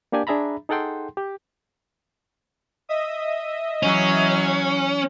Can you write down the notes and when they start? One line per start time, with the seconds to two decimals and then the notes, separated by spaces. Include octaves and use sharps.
0.12 A#3 D4 G4 D5 G#5
0.27 D4 G#4 E5 A#5 B5
0.69 D#4 G#4 A4 F#5 G5 C6
1.17 G4
2.89 D#5 E5 D#6
3.83 E3 F#3 C#4